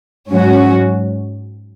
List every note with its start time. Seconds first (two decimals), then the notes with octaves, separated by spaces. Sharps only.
0.30 G#2 F#3 C#4 F#4